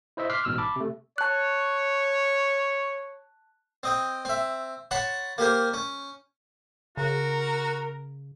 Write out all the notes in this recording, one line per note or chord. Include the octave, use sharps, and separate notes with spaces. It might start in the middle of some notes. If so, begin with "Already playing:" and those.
E4 C5 D#5 E5
C6 D6 F6 F#6 B6 C7
A1 G#2 B2 E6 F6
A5 B5 D6
C3 A3
C#5 A5 F#6
C4 D#5 G5
C4 E5
C#5 F#5 A5 B5 C6
A#3 G4 A#4 C5
C#4
C#3 F#4 A#4